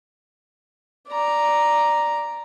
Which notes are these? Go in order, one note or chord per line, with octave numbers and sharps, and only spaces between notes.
D5 A#5